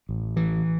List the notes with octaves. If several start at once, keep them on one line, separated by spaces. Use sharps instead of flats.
A1
E3